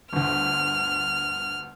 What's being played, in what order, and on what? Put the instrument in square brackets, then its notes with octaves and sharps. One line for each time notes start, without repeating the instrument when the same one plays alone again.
[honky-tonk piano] G1 D2 [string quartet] F6